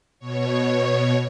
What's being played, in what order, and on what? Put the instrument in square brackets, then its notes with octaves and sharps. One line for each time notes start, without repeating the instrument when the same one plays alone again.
[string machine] B2 C#5